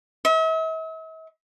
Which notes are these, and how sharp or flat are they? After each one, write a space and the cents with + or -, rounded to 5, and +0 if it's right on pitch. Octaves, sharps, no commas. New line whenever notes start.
E5 -45